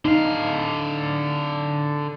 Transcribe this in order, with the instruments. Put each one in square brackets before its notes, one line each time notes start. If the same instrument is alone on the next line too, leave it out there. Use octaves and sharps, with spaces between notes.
[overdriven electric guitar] D3 F5 [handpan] D#4